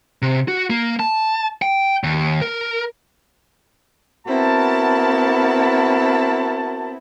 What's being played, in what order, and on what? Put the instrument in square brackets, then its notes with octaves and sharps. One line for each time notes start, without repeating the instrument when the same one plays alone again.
[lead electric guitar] C3
F#4
A#3
A5
G5
D#2
A#4
[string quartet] B3 C4 E4 [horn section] F#4 A#4 A5